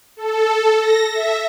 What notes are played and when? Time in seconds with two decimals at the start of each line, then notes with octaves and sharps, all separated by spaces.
0.17 A4
0.80 A#6
1.12 E5